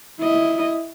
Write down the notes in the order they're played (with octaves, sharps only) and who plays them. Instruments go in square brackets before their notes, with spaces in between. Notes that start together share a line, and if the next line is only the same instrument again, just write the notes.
[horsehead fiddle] E4 D#5